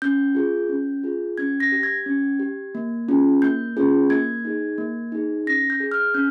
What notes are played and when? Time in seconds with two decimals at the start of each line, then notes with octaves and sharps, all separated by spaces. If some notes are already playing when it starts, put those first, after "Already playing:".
0.02 C#4 G6
0.35 F4 G#4
0.69 C#4
1.04 F4 G#4
1.38 C#4 G#6
1.60 A#6
1.72 G4
1.83 G#6
2.06 C#4
2.40 G4
2.75 A#3
3.09 C#4 F4 G#4
3.42 A#3 G6
3.77 C#4 F4 G#4
4.10 A#3 G#6
4.45 D#4 G#4
4.78 A#3
5.12 D#4 G#4
5.46 C#4 A#6
5.70 G6
5.80 G#4
5.92 F6
6.14 C#4 G6